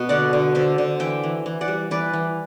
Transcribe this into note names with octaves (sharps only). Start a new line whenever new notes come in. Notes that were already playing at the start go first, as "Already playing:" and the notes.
Already playing: B2 B4
D3 D5 F#5
D3
D3 C5 E5
D3
E3 E5 G5
E3
E3
D5 F#5
G3
E3 B4 D5
E3